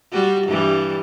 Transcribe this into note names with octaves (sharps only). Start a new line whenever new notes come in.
G3 F#4
G2 E3 G3